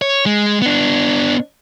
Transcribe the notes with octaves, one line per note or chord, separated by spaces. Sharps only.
C#5
G#3
B3 D4